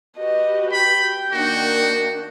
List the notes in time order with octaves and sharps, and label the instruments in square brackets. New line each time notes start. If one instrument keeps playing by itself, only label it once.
[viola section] F#4 G4 B4 [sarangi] D#5
[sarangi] G5 [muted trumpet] B5
[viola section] D#3 A#3 D4 [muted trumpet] F#4